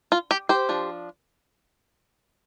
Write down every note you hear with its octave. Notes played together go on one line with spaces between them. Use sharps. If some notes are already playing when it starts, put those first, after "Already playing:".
F4
G4
G4 C5
F3 D4